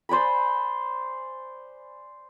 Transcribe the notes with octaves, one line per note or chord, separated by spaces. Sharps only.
C5 D5 G#5 B5